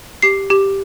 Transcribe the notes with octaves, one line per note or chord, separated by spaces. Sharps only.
G4 C7
G4